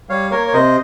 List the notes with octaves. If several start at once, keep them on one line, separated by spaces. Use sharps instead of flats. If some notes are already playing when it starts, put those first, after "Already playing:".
G3 C#5 F5
A#3 A#4 C#5
C#5
C3 C5 D#5